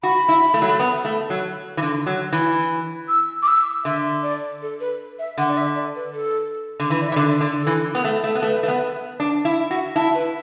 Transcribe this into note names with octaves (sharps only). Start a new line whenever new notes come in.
F#4 B5
E4
A3
F#3
A3
B3
A3
F#3
E3
D3
F#3
E3
E6
D6
E6
D3 E5
D5
A4
B4
E5
D3 F#5
D5
E5
D5
B4
A4
D3
E3 B4
D5
E5
E3
D3
D5
D3
A4
E3
B3
A3
A3
B3
A3 B4
A3
B3
D4
E4
F#4
E4 A5
B4